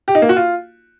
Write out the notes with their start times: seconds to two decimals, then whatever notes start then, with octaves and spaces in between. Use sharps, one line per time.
0.08 G4
0.15 D#4
0.22 A#3
0.29 F#4
0.36 F4